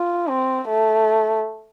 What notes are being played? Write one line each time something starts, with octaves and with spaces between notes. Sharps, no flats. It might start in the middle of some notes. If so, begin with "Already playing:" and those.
Already playing: F4
C4
A3